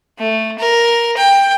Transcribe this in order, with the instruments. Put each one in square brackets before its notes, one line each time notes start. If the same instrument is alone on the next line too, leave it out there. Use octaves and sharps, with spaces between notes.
[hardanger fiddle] A3
A#4
G5